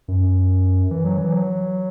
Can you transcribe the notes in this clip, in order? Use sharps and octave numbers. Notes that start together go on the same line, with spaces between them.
F#2
E3
F#3
E3
F#3